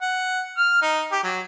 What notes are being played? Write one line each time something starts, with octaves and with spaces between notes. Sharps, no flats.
F#5
F6
D#4
G4
F#3